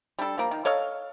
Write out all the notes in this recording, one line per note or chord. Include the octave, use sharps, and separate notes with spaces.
G3 D4 A4
F3 A#3
D#3
A4 C#5 D#5 F5